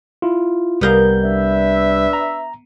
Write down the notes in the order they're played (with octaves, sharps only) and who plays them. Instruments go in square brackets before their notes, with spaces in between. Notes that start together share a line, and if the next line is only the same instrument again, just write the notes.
[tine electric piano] E4 F4
[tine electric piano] C2 G3 G6 [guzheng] B3 A#4 F5
[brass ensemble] D4 B4 E5
[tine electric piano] A#5